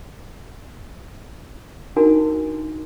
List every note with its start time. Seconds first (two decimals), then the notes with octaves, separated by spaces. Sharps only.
1.96 D4 D#4 F#4 A#4 G#5